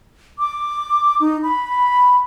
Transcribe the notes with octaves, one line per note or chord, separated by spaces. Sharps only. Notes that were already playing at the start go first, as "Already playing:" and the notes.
D6
D#4
B5